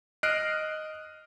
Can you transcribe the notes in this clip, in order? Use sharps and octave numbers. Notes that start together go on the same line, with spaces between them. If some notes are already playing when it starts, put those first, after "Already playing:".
D#5 F6 F#6 C7 D7